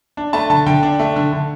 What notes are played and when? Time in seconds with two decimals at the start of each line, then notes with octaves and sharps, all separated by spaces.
0.17 D4
0.33 A3 A5
0.50 D3 A5
0.66 D3 G5
0.83 D4
0.99 A3
1.16 D3
1.33 D3